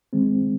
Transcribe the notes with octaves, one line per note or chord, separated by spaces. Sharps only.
D#3 G#3 C4